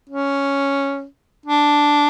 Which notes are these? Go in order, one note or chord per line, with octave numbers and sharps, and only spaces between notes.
C#4
D4